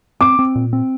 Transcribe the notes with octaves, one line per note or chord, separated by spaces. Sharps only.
C4 D6
C4
A#2
C4